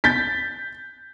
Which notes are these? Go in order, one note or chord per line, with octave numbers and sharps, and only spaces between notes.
G6 A6 B6